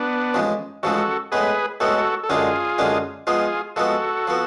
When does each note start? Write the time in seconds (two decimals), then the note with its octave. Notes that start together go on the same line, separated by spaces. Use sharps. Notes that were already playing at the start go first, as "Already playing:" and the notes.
Already playing: B3 D4
0.34 A1 G#2 F3 G#3
0.83 A1 G#2 F3 G#3 F#4 A4
1.32 A2 G#3 B3 G#4 B4
1.80 A2 G#3 B3 F#4 A4
2.24 A4
2.30 F#2 D3 G#3 D4 F4 G#4
2.78 F#2 D3 G#3 D4
3.27 F3 G#3 B3 F4 G#4
3.76 F3 G#3 B3 F#4 A4
4.27 F3 B3